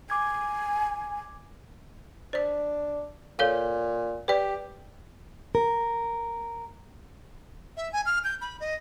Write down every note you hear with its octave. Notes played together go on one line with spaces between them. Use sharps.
G#5 D6 G#6
D4 C5 D5
A#2 A4 C#5 F5
G4 B4 D5
A#4
E5
G#5
F6
G6
B5
D#5